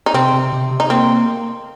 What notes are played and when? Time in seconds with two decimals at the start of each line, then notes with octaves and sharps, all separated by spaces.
0.06 D#4
0.14 C3 C4
0.33 C3
0.53 C3
0.71 C3
0.80 D#4
0.90 A#3 C4